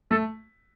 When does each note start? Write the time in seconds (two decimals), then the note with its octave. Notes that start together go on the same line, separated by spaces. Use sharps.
0.11 A3 A4